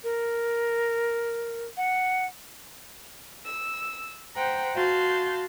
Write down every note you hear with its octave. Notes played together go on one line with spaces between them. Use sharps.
A#4
F#5
E6
C5 F#5 G5 A#5
F#4 F5 A5 C6 G6